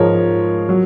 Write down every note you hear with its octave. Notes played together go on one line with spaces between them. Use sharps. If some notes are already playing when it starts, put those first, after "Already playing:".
Already playing: G#2 F3 G#3 A#4 C#5
F#3